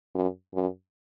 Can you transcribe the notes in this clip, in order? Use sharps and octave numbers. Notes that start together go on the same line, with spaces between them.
F#2
F#2